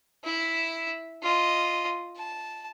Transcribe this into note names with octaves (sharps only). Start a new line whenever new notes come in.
E4 E5
F4 D#5
A5